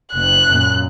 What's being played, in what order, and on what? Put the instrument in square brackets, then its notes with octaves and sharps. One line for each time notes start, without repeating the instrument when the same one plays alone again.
[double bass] F#1 [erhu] F#6
[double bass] F#2 A#2